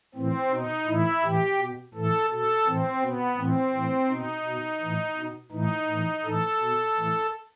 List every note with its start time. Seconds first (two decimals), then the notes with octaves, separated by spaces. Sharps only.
0.15 A2 E3 C4
0.51 B2 D#4
0.87 A2 E3 E4
1.23 A2 E3 G4
1.59 B2
1.94 A2 E3 A4
2.30 B2 A4
2.66 A2 E3 C4
3.01 B2 B3
3.37 A2 E3 C4
3.73 A2 E3
4.09 B2 D#4
4.45 B2
4.81 A2 E3
5.17 B2
5.51 A2 E3 D#4
5.88 A2 E3
6.23 A2 E3 A4
6.60 B2
6.96 A2 E3